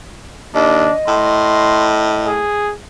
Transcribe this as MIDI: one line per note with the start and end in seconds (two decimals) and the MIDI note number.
0.54 0.87 39
0.54 0.94 62
0.54 2.28 75
1.07 2.42 45
1.07 1.86 84
2.26 2.74 68